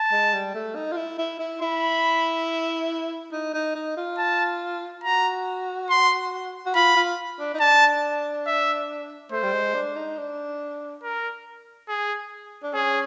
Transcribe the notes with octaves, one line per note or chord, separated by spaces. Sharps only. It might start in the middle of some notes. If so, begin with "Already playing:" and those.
Already playing: A5
G#3
G3
A3
D#4
F4
E4
E4
E4
E4 B5
D#4
D#4
D#4
F4
A5
F#4 A#5
C6
F#4
F4 B5
F4
D4
D#4
D4 A5
E5
A3 C5
G3
G#3
D4
D#4
D4
A#4
G#4
D4
C#4 G#4